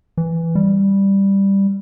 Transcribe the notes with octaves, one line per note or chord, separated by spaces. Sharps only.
E3
G3